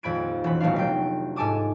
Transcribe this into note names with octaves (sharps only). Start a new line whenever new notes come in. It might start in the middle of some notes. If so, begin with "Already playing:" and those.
D#1 F2 B5 G#6 D7
E1 E3 C#4 B5
D#1 B1 A3 D4 F5
F1 F#3 G5 C7
G#2 A4 G#5 A5 D6 D#6